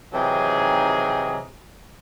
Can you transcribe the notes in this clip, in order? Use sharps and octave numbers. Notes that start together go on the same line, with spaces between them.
C3 D#3 E3 F#3 D#4 G#4